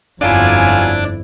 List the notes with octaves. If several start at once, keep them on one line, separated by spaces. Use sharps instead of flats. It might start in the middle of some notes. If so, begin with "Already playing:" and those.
G1 F2 F#3 D4 E4 F4 D5 G#5